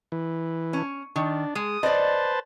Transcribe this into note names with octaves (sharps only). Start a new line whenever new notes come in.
E3
C#4
D#3 D4
G#3 D#6
B4 C5 D5 D#5 A5